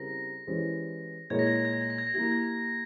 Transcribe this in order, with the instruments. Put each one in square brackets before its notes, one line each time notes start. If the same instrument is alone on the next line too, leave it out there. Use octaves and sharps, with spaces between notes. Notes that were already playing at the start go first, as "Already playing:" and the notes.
Already playing: [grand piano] C#3 G3 C4 E4 A#4 [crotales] A#6
[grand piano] E3 G#3 C#4 G4 C5
[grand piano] A#2 G#3 E4 A#4 C#5 [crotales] G#6
[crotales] A#6
G#6
A#6
G#6
A#6
G#6
A#6
G#6
A#6
[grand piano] A#3 E4 G4 [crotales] G#6
[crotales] A#6
G#6